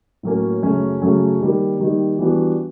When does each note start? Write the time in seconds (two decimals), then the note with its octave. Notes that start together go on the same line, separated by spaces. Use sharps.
0.23 A2 F#3 A#3 C#4
0.62 F#2 C#3 F#3 A3 C#4
1.02 F#2 C#3 F#3 A3 C#4
1.41 D#3 G3 A#3
1.80 D#3 G3 A#3
2.19 E3 G3 B3 D4 F#4